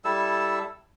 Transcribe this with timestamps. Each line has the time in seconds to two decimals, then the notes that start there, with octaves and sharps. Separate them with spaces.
0.05 G3 E4 A4 E6